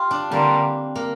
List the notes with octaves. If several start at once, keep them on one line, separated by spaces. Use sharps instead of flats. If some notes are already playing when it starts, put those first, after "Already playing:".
Already playing: F4 G4
D4
D3 G3 A#3 C4
A#3